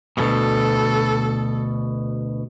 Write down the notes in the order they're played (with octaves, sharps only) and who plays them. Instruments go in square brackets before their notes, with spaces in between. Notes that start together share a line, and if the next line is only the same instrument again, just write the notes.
[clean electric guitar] D2 G2 B2 [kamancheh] A4